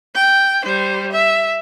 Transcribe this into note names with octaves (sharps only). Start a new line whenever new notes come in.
G5
G3 C5
E5